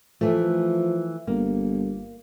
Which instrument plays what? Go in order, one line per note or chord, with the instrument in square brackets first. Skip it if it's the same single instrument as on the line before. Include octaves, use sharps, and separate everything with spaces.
[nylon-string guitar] E3 A3 [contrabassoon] F3
[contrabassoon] G1 [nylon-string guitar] A#3